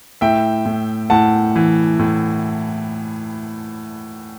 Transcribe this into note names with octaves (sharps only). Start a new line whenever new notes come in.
A2 E5 G5
A2
A2 F#5 A5
E3
A2